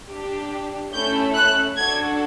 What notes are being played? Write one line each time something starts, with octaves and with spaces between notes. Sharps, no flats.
D4 G4
A3 C#4 E4 A4 G6
F#6
D4 F#4 A4 G#6